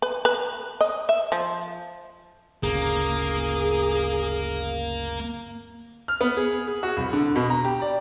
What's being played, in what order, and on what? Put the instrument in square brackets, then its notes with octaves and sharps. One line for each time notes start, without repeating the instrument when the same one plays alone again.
[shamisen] B4
B4
D#5
E5
F3
[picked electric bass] G1 D2 C#3 [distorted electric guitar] A#3 [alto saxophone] G#4
[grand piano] F6
B3
G#4
G#4
F#4
C2
D3
B2
A#5
G4
D5